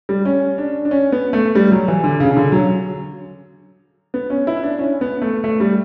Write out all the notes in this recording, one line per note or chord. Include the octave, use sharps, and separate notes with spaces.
G3
C#4
D4
D4
C#4
B3
A3
G3
F#3
E3
D3
C#3
C#3
D3
F#3
B3
C#4
E4
D4
C#4
B3
A3
A3
G3